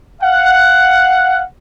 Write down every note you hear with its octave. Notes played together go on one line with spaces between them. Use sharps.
F5 F#5